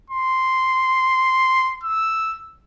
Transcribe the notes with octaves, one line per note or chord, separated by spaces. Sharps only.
C6
E6